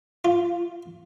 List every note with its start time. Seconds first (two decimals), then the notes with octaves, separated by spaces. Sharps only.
0.25 F4